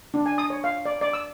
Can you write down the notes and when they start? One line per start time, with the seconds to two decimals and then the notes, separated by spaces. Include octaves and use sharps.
0.14 D4
0.26 G#5
0.38 D#6
0.50 C#5
0.64 F5
0.85 D5
1.01 D5
1.13 E6